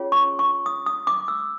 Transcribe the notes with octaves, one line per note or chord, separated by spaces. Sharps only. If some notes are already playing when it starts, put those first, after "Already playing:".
Already playing: C#4 F4 G#4 C#5
C#6
C#6
D#6
D#6
D6
E6